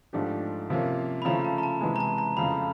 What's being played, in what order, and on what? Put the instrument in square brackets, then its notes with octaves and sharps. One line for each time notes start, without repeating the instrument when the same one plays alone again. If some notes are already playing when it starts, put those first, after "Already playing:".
[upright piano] G#2 F3 A3 D4 G4
C3 F3 A#3 C#4
[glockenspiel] B5
[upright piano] C#3 F3 A3 C#4 E4 [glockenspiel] A#5
[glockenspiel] A5
A#5
A5
[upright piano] C3 E3 G#3
[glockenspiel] A#5
A5
A#5
[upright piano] F2 C#3 F3 A3 [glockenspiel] B5